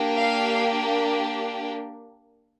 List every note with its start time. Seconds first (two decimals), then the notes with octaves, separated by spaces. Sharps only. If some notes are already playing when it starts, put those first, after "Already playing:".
Already playing: A#3 D4 G4
0.17 F5